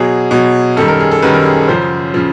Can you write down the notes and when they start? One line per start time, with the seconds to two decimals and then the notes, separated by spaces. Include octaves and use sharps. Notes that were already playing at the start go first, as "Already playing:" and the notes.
Already playing: B2 F#3 G#4
0.31 B2 F#3
0.77 F#2 D#3 G3 A4
0.88 A#4
1.00 G#4
1.11 A4
1.22 F#2 D#3 G3 B4
1.34 A#4
1.45 G#4
1.57 A4
1.68 F#2 C#3 F3 C5
2.14 C#3 F3